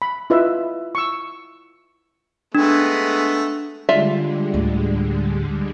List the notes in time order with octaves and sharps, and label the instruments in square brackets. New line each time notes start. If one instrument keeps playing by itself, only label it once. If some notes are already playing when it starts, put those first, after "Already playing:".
[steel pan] B5
E4 F4 B4 D#5 E5
C#6 E6
[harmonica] G#3 A3 B3 [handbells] D4
[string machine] D3 G3 G#3 [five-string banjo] F4 D5 E5
[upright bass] D2 A2